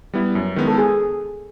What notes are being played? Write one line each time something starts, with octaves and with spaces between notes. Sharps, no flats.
G3 B3 E4
F#2
D#3 G#3 B3 E4
A4
G#4